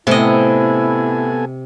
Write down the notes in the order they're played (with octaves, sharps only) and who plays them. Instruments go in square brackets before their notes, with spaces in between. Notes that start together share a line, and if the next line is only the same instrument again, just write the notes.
[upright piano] A2 [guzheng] C3 D#5 [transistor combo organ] B3 A4 G#5 [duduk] E4